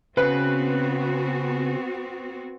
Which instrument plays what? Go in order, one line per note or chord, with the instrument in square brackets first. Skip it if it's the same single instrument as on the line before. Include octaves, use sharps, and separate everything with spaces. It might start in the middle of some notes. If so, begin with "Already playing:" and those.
[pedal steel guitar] C#3 [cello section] B3 C4 F#4 [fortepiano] B4